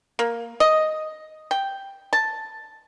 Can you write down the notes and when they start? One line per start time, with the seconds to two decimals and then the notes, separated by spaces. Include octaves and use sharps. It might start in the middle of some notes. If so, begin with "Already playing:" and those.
0.19 A#3
0.60 D#5
1.51 G5
2.13 A5